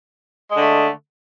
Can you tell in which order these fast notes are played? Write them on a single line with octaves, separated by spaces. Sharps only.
G#3 D3 A3